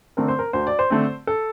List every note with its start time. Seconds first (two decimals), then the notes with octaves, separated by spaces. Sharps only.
0.17 D3 A3 C4 A#4
0.28 C5
0.39 A#4
0.53 D2 C5
0.67 D5
0.79 C5
0.90 D3 A3 C4
1.27 A4